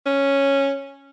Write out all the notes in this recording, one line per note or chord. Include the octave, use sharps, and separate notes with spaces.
C#4